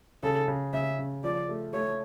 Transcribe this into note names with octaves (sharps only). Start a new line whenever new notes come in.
C#3 A4
C#3
C#3 E5
C#3
F3 D5
A3
A3 C#5